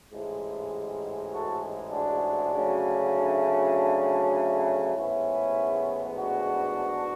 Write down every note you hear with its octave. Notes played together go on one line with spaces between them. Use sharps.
A1 G#2 G#3
F#4 A4
D4 F#4
D2 C#3 F#3 A3
D4
D4
A1 G#2 G#3 B3 C#4 E4
D4 F#4